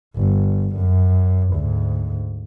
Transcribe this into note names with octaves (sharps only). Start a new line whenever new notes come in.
G1
F#2
D2 G#2